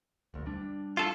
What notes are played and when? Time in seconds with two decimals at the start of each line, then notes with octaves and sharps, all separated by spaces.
0.34 E1 D2
0.46 G3 D4
0.97 F4 A4